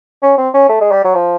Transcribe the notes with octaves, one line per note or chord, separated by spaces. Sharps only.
C#4
C4
C#4
A3
G#3
G3
F#3
F3